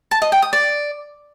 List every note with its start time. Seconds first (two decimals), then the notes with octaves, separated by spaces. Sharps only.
0.11 A5
0.22 D#5
0.32 G5
0.42 D#6
0.53 D5